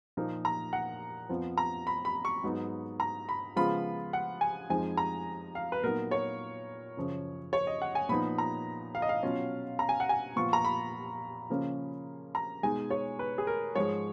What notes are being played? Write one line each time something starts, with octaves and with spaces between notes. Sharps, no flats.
A#2 F3 A#3 D#4
A#5
F#5
F2 F3 B3 F4
A#5
B5
B5
C#6
G#2 F#3 B3 D#4
A#5
B5
C#3 F3 G#3 B3 F4 B5
F#5
G#5
F2 F3 G#3 D#4 G#5
A#5
F5
B4
A#2 F#3 B3 D#4 A#4
C#5
F#2 C#3 F3
C#5
D#5
F#5
G#5
A#2 F3 B3 D#4 B5
A#5
F5
D#5
F5
B2 F#3 C#4 F4
A#5
G#5
F#5
G#5
A#2 F3 B3 F4 C#6
A#5
B5
C#3 F3 A#3 C#4 F4
A#5
B2 G#3 D#4 G#5
C#5
B4
G#4
A#4
G#2 F3 G#3 C#5